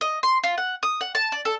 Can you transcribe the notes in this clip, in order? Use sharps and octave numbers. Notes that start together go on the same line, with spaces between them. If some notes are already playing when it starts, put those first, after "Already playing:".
D#5
C6
F4
F#5
D#6
F#5
A5
D5
A4